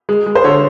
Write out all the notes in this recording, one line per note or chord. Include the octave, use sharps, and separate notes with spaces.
G#3
G#3
C5
D3 C#5